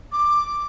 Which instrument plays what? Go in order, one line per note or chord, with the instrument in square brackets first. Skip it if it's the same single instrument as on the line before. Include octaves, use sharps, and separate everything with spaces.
[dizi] D6